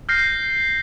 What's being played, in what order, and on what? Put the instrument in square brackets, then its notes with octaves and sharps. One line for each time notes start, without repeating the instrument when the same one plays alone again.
[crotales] F6 G6 A#6 C7